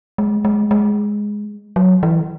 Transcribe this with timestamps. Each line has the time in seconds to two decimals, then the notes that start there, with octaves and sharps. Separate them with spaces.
0.18 G#3
0.45 G#3
0.71 G#3
1.76 F#3
2.03 E3